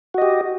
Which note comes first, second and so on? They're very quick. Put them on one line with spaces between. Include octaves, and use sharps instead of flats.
F#4 D#5 G4